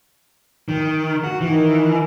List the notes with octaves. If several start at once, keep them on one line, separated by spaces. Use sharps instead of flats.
D#3
F#4
D#3 E3